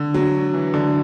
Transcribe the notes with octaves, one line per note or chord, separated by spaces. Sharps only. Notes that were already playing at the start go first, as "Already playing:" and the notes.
Already playing: D3
F#3
E3
D3